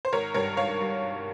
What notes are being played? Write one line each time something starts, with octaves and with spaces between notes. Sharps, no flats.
C5
G#1 A#4 C#5
G2 G3 A#4 C#5
G#1 C#5 F5
G3